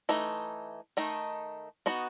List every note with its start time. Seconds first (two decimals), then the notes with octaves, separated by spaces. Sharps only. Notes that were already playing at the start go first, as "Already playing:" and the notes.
0.09 E3 A3 D#4
0.97 D#3 A3 D#4
1.86 B3 D#4 F#4